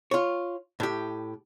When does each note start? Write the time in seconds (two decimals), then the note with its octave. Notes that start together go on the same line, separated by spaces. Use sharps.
0.11 F4 C#5
0.80 A2 G4